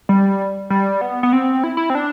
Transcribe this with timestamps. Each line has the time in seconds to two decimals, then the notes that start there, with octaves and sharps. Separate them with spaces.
0.09 G3
0.70 G3
1.01 B3
1.23 B3
1.33 C4
1.64 E4
1.77 E4
1.90 C4
1.95 D4